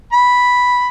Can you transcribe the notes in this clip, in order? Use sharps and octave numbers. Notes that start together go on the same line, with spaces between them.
B5